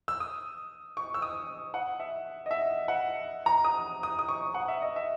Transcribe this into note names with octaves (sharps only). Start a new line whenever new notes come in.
E6
D#6
C#6
E6
D#6
F#5
E5
D#5
E5
F#5
A#5
D#6
D#6
D#6
C#6
F#5
E5
D#5
E5